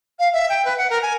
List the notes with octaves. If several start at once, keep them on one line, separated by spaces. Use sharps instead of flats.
F5
E5
G5
B4
F#5
A#4
G#5